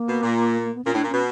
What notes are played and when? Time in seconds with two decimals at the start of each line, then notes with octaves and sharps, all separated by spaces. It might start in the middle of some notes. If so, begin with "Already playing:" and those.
Already playing: A#3
0.08 B2
0.23 A#2
0.65 A#3
0.75 B3
0.85 A#2 C#4
0.94 A2 D4
1.03 A#2
1.09 B2 C#4